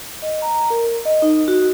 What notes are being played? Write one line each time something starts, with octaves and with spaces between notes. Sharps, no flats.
D#5
A#5
A#4
D#5
D#4
F#4